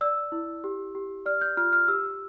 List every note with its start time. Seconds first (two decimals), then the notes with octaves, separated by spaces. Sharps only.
0.01 D5 E6
0.32 E4
0.64 G4
0.95 G4
1.26 D5 F6
1.41 G6
1.57 F4 F6
1.73 F6
1.88 G4 E6